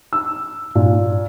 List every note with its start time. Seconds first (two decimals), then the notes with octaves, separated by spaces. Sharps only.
0.13 E6
0.75 A#2